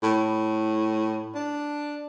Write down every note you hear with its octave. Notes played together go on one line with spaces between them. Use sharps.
A2
D4